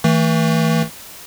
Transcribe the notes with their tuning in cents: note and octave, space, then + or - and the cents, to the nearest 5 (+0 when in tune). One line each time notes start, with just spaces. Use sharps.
E3 -30 A3 +30